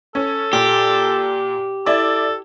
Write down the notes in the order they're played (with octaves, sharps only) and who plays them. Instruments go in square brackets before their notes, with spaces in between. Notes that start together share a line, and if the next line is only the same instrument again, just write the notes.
[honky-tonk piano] C#4 [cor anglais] A4
[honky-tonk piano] A#2 [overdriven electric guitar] G4
[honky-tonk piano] E4 D5 [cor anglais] A4